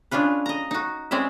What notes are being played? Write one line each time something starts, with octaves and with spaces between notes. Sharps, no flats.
G#3 C#4 D4 F4 B4
D#5 A#5
D#4 F#4
G#3 C4 C#4 D5 E5